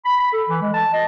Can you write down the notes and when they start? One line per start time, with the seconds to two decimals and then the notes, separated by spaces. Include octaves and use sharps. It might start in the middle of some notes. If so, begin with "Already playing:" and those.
0.05 B5
0.20 B5
0.33 A4
0.49 E3
0.62 G#3
0.74 A5
0.93 D#5